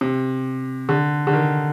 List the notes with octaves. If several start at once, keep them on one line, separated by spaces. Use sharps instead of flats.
C3
D3
D3
D#3